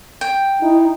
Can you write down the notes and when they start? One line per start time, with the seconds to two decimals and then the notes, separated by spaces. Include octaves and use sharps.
0.21 G5
0.61 D#4 E4